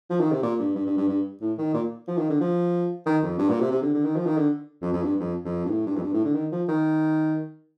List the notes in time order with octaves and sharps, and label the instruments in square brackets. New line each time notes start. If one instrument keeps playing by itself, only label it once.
[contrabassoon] F3
D#3
C3
A#2
G2
G2
G2
G2
G2
A2
D#3
A#2
F3
D#3
D3
F3
D#3
F2
G2
A#2
C3
C3
D3
D3
D#3
F3
D#3
D3
F2
F2
G2
F2
F2
G2
A2
G2
F2
G2
A2
D3
D#3
F3
D#3